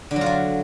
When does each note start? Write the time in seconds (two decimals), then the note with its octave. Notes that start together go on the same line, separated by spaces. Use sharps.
0.11 D3
0.16 F#3
0.21 F4
0.26 F#3